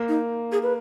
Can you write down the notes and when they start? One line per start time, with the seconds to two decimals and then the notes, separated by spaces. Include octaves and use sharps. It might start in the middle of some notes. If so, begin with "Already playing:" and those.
Already playing: A#3
0.08 D#4
0.52 G#4
0.63 B4